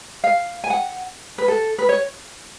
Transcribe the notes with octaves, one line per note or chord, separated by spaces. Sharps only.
F5
G#5
F#5
B4
A4
B4
C#5